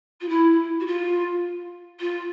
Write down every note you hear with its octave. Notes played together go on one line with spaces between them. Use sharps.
F4
E4
F#4
F4
F4